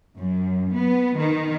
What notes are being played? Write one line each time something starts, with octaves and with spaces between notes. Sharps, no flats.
F#2
B3
D#3